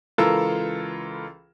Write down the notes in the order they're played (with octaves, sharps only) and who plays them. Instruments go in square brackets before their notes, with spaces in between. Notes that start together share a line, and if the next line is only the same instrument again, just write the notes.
[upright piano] C#2 E3 F4 A4 A#4 E6